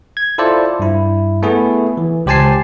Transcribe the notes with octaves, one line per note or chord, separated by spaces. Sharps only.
G#6
E4 F4 A4 C5 D5
G2 E4
A3 B3 E4 G#4
E3
C#2 G4 C5 G#5 A5 C7